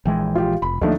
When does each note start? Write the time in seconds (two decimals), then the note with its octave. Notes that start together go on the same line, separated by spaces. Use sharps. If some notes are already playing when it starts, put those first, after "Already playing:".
0.05 A#1 E3 G#3 G5
0.35 F4 G4
0.62 F1 B5
0.81 D2 F3 A3 A#3 D4 D#4